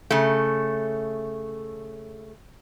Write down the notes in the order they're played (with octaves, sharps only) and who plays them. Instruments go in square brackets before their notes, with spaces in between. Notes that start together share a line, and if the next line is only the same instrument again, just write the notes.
[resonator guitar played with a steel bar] C#3 A3